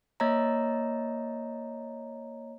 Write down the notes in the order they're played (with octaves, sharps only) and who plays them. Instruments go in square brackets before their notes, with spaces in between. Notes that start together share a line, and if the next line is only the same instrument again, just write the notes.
[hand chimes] A#3 C#5 D#5 A#5